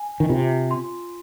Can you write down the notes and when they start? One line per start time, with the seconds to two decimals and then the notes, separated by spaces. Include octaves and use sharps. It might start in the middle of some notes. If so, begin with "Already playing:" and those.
Already playing: G#5
0.20 D#3
0.29 C3 F4
0.71 C6